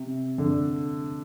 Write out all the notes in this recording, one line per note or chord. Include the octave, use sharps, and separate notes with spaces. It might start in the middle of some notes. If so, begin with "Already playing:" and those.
Already playing: C3
D3